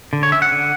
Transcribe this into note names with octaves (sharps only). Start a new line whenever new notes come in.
D3
C#5
C#4 E5
F#5
D3